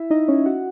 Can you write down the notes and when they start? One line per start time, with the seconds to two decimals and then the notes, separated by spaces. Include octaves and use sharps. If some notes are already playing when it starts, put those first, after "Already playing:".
Already playing: E4 E5
0.10 D#4 D#5
0.28 C#4 C#5
0.46 F#4 F#5